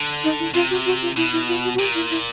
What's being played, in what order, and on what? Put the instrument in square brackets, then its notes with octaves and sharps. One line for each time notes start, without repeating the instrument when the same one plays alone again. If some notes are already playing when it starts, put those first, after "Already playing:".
Already playing: [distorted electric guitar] D3
[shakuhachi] D#4
E4
[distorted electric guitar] C3 [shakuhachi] F4
[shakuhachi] F#4
F#4
F4
[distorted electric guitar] B2 [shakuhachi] E4
[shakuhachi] E4
F4
F#4
F#4
[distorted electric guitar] A#2 [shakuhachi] G4
[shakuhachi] E4
E4